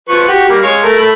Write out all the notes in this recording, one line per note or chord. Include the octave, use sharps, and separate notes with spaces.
F3 B4 C#6
F#4 G4
G3 A#3
G#3 C#5 F5
A3 A#4
A3 B5